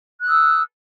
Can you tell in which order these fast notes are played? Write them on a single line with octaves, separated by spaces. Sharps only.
F#6 D#6 E6